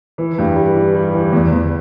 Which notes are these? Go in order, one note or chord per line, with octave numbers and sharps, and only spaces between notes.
E3
G2
G3
E3
G3
E3
E2
E2